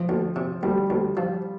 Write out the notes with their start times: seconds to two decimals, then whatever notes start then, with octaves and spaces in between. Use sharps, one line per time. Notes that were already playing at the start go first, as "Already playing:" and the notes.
Already playing: F3
0.09 D2
0.36 C3
0.63 D2 G3
0.90 D2
1.17 F3